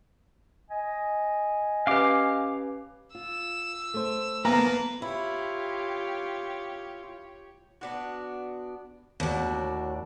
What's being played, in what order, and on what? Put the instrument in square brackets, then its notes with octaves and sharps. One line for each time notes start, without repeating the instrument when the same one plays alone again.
[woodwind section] D#5 G#5
[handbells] C#4 G4 B4 [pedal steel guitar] F5 D6
[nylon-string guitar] F4 [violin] E6
[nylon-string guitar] A3 C5
[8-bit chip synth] A#3 [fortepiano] B3 A#5 [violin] B4 A5
[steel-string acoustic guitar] E4 [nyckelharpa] F4 [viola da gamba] G4 C#5
[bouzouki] B3 D4 F#4
[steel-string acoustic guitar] D#2 A2 [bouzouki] D4 F#4